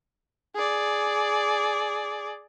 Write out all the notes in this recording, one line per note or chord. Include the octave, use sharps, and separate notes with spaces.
G#4 D5